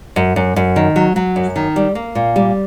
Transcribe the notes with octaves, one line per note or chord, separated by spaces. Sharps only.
F#2
F#2
F#2
D#3
F#3
F#3
F#2
D#3
G3
A#3
A#2
G3